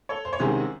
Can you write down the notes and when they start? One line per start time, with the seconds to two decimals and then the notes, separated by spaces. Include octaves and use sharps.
0.09 A4 C#5
0.25 C5
0.33 C#5
0.39 C2 C3 D#3 G#3 C#4 G#4 C5